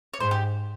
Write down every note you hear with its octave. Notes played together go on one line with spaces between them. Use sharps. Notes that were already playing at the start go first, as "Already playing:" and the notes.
C#5
G#2 C5
G4